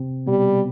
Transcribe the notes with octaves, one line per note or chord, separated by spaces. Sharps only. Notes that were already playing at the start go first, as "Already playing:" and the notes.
Already playing: C3 C4
B2 G3 B3